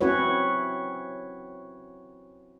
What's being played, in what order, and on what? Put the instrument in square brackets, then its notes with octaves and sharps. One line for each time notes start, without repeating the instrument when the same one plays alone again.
[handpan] C4 C#4 E4 F#4 B4 C#5